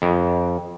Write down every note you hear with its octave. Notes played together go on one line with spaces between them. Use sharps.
F2